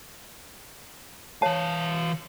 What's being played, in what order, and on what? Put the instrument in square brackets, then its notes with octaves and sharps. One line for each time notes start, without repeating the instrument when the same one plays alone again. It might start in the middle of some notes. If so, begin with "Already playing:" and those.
[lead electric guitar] E3 F5 [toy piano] C#5 A5